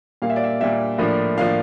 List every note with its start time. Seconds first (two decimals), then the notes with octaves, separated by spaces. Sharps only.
0.22 A#2 G3 A#3 F5
0.30 E5
0.36 D5
0.44 E5
0.60 A#2 G3 A#3 E5
0.98 A2 F3 A#3 D4
1.37 A2 F3 A#3 D4 F5